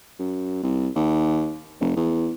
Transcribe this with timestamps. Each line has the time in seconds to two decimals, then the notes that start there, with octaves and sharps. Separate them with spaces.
0.19 F#2
0.63 C2
0.95 D#2
1.80 F1
1.96 E2